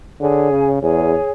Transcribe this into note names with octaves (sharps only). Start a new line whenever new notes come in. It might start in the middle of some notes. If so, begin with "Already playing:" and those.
D3 G#4 C#5 G#5
C#3
E2 G#4 C#5 G#5